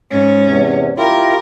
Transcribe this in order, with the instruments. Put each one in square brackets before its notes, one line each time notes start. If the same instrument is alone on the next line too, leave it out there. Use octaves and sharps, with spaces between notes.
[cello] G#2 C#4
[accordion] E2 C3
[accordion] E4 F4 G4 [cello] A#4